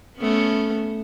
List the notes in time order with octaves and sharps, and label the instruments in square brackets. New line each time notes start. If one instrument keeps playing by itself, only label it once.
[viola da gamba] A3 B3 C#4